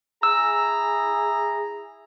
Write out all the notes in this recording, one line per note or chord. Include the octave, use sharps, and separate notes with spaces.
E4 G#4 A#5 E6